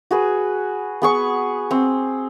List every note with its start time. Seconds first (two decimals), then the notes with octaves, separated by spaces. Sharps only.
0.11 F#4 G#4 B4
1.02 B3 G#4 C#6
1.71 C4